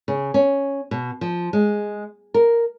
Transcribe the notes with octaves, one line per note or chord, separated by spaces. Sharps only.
C#3
C#4
B2
F3
G#3
A#4